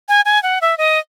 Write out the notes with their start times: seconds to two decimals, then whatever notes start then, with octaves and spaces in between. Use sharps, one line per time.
0.09 G#5
0.25 G#5
0.43 F#5
0.61 E5
0.78 D#5